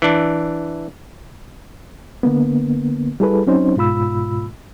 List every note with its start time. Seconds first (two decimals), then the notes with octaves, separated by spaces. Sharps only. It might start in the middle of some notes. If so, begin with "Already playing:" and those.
0.02 E3 D4
2.23 D3 A#3 B3
3.20 G3 E4 G#4 A4 B4
3.47 F#3 C4 C#4 D#4 C5
3.76 G#2 B2 F4 B5 E6